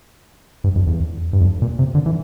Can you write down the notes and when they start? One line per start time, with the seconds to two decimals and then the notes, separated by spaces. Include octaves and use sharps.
0.64 G2
0.76 F2
0.87 E2
1.33 G2
1.41 F2
1.62 A#2
1.79 C3
1.95 D3
2.06 E3